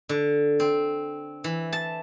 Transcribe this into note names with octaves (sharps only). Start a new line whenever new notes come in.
D3
C4
E3
A5